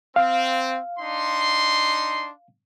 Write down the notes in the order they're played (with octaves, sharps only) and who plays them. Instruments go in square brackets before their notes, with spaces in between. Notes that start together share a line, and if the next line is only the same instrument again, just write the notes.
[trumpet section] C4 [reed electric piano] F5
[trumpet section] D4 D#4 C6